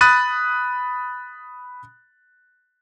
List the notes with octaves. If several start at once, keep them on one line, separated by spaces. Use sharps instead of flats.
B5 D#6 F#6 A6 D#7